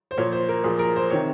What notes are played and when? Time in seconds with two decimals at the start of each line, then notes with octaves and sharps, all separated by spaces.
0.11 C5
0.17 A#2 F3 C#5
0.32 C5
0.49 A#4
0.64 A#2 F3 G#4
0.79 A#4
0.96 C5
1.10 C3 D#3 C#5